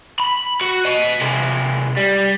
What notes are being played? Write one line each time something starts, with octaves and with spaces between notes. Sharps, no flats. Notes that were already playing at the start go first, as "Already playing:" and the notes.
B5
F#4
D#5 F#5
C3 G#3
G3